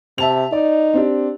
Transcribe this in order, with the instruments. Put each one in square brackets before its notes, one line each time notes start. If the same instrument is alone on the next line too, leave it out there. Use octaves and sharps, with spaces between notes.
[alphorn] C3 [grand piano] E5 A5 F7
[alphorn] D#4 [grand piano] D5
[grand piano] C4 D4 G4